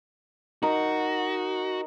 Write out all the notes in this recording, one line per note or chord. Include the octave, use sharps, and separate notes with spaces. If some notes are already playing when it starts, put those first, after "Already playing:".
D#4 F#4 A#4